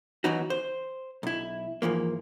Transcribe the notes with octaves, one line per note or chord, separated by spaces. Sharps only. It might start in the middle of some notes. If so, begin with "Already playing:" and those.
E3 F#3 B3 D#4 F#4
C5
B1 E4
G#2 E3 F3 A#3